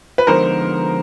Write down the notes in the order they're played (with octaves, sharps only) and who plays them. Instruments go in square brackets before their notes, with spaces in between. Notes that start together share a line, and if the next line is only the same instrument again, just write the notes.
[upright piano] B4
[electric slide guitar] D3 F3 G#3 B3 D#4 [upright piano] A#4 C5